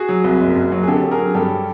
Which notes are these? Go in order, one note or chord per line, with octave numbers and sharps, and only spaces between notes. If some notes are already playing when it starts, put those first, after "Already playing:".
Already playing: F#4 G#4
F#3
C2
F#1
F#1
F#3
G#4
D3 G4 A4
D3
G#4 A#4
F#3
G2 G4 A4